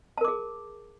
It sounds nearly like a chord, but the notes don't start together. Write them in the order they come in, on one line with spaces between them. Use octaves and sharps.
A5 A#4 D6 G#4